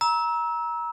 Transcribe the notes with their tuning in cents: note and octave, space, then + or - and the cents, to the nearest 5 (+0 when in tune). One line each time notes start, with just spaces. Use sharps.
A#5 +25 E6 -20